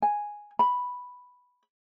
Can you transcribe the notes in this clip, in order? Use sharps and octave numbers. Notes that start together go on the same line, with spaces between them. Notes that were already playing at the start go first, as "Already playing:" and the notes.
G#5
B5